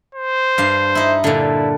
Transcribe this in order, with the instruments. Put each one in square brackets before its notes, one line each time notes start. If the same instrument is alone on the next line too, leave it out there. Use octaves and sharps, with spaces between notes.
[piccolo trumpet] C5
[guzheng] G2 F5
D#4 E4
[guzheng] A#2 D3 [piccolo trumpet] E4